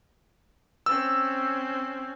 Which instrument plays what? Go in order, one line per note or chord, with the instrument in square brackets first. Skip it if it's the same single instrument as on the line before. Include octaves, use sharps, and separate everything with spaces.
[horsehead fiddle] C4 C#4 [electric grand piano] E6